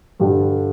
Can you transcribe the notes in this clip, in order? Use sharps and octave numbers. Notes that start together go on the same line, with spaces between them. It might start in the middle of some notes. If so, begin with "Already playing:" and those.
G2 D3 G3 D4